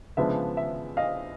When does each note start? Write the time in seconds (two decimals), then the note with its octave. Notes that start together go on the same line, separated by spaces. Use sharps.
0.17 C#3 F3 G#3 B3 D4 E5
0.57 E5
0.97 D#5 F5